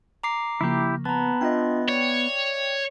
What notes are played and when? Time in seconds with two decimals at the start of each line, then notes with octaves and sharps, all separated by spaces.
0.24 A#5 D6 C7
0.61 C#3 F3 A#3 E4 G4
1.05 B3 A5 A#5
1.41 D4 F4 D#5 E5 G5
1.89 C#5 D5